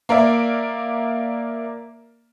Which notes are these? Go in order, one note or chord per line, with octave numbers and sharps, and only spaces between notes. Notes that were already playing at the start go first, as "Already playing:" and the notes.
A#3 A#4 D5 E5